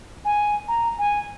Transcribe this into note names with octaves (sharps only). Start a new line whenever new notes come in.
G#5
A#5
G#5